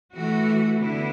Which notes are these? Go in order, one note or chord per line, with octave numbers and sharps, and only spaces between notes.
E3 A3 F#4
D3 B3 E4